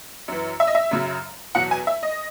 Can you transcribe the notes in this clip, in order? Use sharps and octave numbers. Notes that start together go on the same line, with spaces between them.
F#2 E3
E5
D#5
E5
F#2 C#3 F#3
E2 B2 F#3 F#5
G#5
E5
D#5